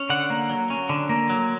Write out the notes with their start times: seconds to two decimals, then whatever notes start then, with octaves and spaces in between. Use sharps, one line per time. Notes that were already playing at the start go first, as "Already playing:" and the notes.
Already playing: C#4
0.10 D3 F#5
0.30 A#3
0.50 F#3
0.70 C#4
0.89 D3
1.09 A#3
1.30 F#3